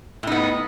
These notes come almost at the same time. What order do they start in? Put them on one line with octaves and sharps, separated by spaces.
A2 D#4 B3